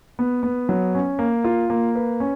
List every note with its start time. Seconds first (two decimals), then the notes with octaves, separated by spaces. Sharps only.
0.19 B3
0.43 B3
0.69 F#3
0.95 C#4
1.19 A#3
1.44 F4
1.70 A#3
1.95 B4
2.20 C#4